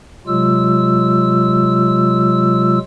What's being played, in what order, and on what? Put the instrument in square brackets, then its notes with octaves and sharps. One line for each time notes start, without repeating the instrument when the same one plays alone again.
[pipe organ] C3 F#3 G#3 F4 E6